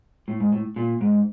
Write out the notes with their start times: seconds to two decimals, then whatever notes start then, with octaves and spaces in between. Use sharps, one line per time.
0.28 A2
0.40 G#2
0.52 A2
0.76 A#2
1.01 G#2